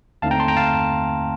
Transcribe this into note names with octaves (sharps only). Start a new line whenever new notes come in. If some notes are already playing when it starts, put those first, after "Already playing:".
D#2 D3 A3 C4 D#4 F5 A5
G5 A#5
A5 C6
G5 A#5
F5 A5